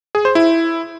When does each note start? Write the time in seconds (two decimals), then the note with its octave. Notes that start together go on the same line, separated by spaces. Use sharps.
0.15 G#4
0.25 C5
0.35 E4